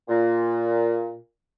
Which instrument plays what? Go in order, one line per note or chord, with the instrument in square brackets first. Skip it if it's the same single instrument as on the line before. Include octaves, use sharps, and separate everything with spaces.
[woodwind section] A#2